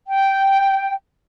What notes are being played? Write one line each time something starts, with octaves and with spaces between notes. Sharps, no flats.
G5